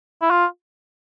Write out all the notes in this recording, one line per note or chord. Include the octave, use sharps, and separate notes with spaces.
E4
F4